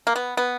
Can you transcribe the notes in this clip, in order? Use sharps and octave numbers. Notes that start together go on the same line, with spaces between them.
A#3
B3
B3